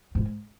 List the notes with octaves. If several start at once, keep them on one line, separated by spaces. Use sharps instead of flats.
G#2